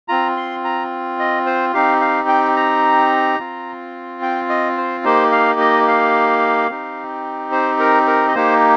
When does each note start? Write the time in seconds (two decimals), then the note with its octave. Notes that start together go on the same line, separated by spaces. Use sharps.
0.08 C4 F4 A#5
0.37 C6
0.64 A#5
1.19 D#5
1.46 C5
1.74 C4 D#4 G4 F5
2.01 F5
2.28 G5
2.57 A#5
3.40 C4 F4
4.22 G5
4.49 D#5
4.77 C5
5.04 A#3 D#4 G4 C5
5.32 F5
5.60 D#5
5.88 F5
6.70 C4 D#4 G4
7.52 C5
7.80 A#4
8.07 A#4
8.28 D#5
8.35 A#3 D#4 G4 C5